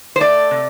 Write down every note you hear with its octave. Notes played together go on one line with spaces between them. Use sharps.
C5
A3 D5
C3